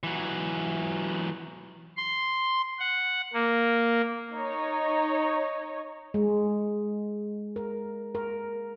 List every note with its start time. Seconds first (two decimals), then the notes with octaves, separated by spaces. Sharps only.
0.03 E3 F#3
1.97 C6
2.79 F#5
3.33 A#3
4.32 D#4 C#5
6.14 G#3
7.56 A#4
8.15 A#4